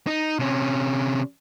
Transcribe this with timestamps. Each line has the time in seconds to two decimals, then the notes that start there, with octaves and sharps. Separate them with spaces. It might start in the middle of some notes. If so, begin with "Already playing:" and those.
0.07 D#4
0.39 C3 C#4